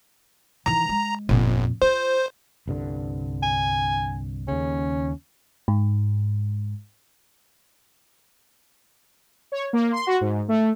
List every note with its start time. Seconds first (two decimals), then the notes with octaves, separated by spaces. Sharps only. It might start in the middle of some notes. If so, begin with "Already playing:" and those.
0.66 D#3 E3 A#5
0.89 G#3
1.29 G1 F2 A#2
1.82 F4 C5
2.68 C2 G2 D3
3.43 G#5
4.48 D#2 C#3 C#4
5.68 G#2
9.52 C#5
9.73 A#3
9.92 C6
10.07 F#4
10.21 G#2
10.48 A3